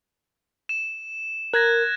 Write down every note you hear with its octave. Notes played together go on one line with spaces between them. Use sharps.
E7
A#4 F#6 G#6 A#6